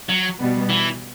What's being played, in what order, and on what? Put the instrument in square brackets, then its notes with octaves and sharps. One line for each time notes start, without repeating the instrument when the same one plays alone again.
[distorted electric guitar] F#3
[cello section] B2 G3 B3
[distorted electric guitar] E3